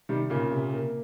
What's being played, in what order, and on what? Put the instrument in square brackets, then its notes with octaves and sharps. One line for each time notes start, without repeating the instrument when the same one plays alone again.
[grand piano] C3 [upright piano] D#3 G3
[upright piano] A#2 C#3 [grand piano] A#3
[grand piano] C3
A#3